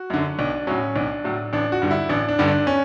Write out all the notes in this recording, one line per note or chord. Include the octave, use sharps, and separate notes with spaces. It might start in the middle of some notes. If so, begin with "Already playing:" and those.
Already playing: F#4
F#2 D3
B1 D4
A2 F#3 C#4
B1 D4
A2 F#3
A1 D4
F#4
G2 D3 G3
E4
A1 D4
D4
G2 D3 G3
D4
C#4